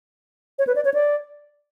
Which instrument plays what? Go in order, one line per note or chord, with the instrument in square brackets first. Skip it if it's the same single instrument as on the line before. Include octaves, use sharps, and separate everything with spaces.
[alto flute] C#5
B4
D5
C#5
D5